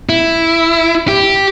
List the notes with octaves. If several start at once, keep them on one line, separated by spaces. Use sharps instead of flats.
E4
G4